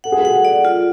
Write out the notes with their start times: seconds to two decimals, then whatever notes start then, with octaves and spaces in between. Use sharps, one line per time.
0.04 A4 F#5
0.12 G#4
0.20 F#4 A4 F#5
0.45 D5
0.65 F4